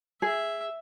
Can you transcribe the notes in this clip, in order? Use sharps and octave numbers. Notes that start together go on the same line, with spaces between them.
G#4 E5